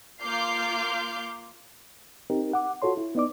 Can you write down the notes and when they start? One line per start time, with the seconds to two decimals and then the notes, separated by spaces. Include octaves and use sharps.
0.21 A#3 F4 D6 F6 G6 C7
2.30 C4 D#4 G4 A#4
2.53 F#5 D6
2.82 F4 F#4 A4 C#5 C6
2.97 E4
3.15 B3 D#4 D5 D6